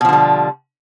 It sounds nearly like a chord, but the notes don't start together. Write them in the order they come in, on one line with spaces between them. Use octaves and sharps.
B2 F3 D3 G3